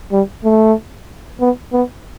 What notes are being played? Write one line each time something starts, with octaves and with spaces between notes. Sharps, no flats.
G3
A3
B3
B3